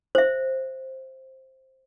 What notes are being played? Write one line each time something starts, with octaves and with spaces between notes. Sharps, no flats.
C5 E5